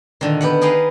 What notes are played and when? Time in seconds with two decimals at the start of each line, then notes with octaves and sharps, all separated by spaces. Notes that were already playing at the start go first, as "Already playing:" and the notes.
0.21 A#2 D3 D#3
0.41 B3 G4 F#5
0.61 D#4 G#4 A#4 B4 F5 F#5